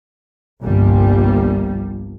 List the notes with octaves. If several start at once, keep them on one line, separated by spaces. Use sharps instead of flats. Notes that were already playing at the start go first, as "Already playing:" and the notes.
G1 C2 F3 G3 A#3